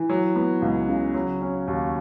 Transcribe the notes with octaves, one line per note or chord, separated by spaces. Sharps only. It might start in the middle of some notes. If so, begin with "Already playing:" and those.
Already playing: E3
F#3
B3
C#2
C#3
F#3
C#4
D#2